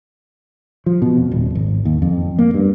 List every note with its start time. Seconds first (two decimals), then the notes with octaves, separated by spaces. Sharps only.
0.86 F3
1.02 B2
1.17 F2
1.31 D#1
1.55 G#1
1.85 D#2
2.02 F2
2.39 A#3
2.54 G2